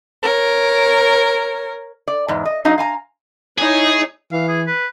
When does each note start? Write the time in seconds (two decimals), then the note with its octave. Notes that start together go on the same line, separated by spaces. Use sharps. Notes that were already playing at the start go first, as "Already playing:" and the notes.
0.23 A#4 C#5
2.08 D5
2.28 E2 G#2
2.45 D#5
2.65 F#3 D#4 D#5 F5 A#5
2.78 F5 G#5 A#5
3.58 D#4 E4 G#4 C#5
4.32 E3 F5
4.48 G#4
4.67 B4